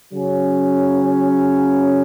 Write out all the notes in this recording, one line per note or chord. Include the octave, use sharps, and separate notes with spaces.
C#3 F#3 C#4